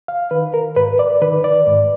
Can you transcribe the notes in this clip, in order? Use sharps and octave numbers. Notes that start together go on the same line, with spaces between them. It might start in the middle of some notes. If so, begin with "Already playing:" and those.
F5
D#3 B4
A#4
G#2 B4
D5
D#3 B4
D5
G#2